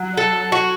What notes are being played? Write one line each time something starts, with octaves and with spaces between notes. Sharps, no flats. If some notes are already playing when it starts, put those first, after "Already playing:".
Already playing: F#3
A4
F#4